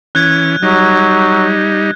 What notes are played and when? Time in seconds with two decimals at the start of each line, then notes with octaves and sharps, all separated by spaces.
0.15 E3 C#4 F#6 G#6
0.62 F#3 G3 D#4